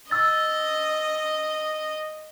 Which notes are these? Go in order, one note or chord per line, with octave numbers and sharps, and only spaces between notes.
D#5 E6 A6